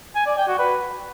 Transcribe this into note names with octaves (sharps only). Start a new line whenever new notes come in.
G#5
D5
G5
F#4
B4